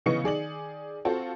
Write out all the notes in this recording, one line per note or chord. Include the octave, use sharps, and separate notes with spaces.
C#3 E3 B3 D#5 C#6 C#7
D#3 G#4 D5 F#7
C4 F4 F#4 A4